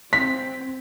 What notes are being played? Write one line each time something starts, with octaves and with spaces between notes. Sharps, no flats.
C4 B6